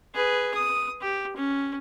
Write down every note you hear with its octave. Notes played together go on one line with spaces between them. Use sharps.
G#4 B4
D#6
G4
C#4